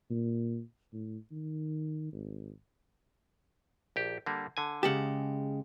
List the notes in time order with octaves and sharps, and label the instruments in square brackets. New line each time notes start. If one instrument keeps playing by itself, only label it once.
[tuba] A#2
A2
D#3
G#1
[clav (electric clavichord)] A#1 G4
D3 G3 A#3
D3 G#5
[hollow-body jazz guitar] C#3 G#3 G4 [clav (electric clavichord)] F#5 A5